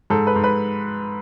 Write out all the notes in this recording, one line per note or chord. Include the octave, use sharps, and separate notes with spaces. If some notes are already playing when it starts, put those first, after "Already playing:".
G#2 A4
B4
G#2
B4